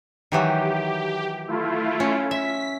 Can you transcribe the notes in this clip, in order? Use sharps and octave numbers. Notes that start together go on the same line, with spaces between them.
D#3 E3 F#3 G4
A3 E4 F4
C#4
E5 B6